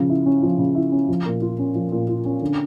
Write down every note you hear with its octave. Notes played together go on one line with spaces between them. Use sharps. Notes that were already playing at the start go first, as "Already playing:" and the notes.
Already playing: C#3 F3
E4
C#4
F3
C#3
E4
C#4
F3
A#2
F4
C#4
F3
A#2
F4
C#4
D3